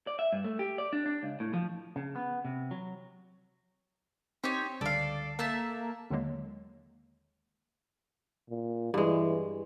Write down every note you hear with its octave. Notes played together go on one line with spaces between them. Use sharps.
D5
E5
G2
A3
G4
D5
D4
D4
C#2
A2
F3
C#3
B3
C3
F#3
C4 D#4 G4 C#5
C#2 D3 G3 A4 D5 F5
A3 A#3 E5 A5
D#2 D3 D#3 F#3 G#3 A#3
A#2
G2 E3 G#3